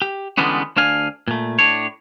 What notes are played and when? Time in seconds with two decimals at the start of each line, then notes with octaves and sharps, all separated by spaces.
0.02 G4
0.37 D3 E3 G3 G#3 B3 C#4
0.76 D2 D4 F5 G#5
1.28 A#2 A3
1.59 A2 D4 C#5